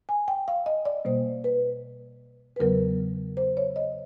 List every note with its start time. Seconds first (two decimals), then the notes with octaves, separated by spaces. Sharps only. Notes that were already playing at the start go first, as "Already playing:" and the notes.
0.09 G#5
0.28 G5
0.48 F5
0.66 D#5
0.85 D5
1.05 B2 G3 A#3 C5
1.44 B4
2.56 B4
2.60 E2 C#3 F#3 B3 A#4
3.37 C5
3.57 C#5
3.76 D#5